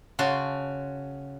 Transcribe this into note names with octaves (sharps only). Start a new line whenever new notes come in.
C#3 F#4 A5 C6